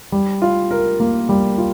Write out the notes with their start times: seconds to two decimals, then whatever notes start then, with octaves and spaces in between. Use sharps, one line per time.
0.12 G3
0.42 F4
0.71 A#4
1.00 A#3
1.29 G3
1.58 F4